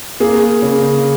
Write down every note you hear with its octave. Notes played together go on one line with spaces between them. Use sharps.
A#3 G#4
C#3